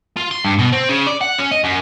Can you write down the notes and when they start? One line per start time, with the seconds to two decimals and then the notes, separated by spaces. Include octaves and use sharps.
0.17 F4
0.31 C6
0.45 G2
0.59 B2
0.72 C4
0.89 C#3
1.07 D5
1.21 F#5
1.38 C#4
1.51 D#5
1.64 F#2